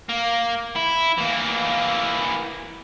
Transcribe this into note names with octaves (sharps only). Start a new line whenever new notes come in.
A#3
E4
E3 A#3